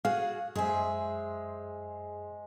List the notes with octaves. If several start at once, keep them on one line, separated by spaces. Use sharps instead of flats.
F#4 G#4 F5
F#2 G#3 G#4 C5 E5